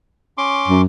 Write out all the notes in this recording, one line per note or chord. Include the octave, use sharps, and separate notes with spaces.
C#4 C6 D6
F#2